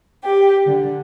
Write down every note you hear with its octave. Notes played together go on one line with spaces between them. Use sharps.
G4
D3